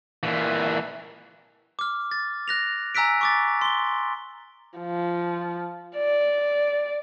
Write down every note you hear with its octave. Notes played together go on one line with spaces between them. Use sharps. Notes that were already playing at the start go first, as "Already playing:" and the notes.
A#2 E3
D6 F6
A6
F#6 A#6 F7
G#5 A#5 E6 F#6 B6 D7
C#6 D6 A6
C6 G7
F3
D5